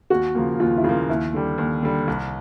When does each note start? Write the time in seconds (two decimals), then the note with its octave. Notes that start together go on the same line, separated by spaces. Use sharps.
0.10 D#2 F#4
0.35 C#3 F3 A#3
0.59 D#2 F4
0.77 E4
0.84 C#3 F3 A#3 F4
1.09 D#2 E4
1.34 D3 G3
1.58 D#2
1.83 D3 G3
2.07 C2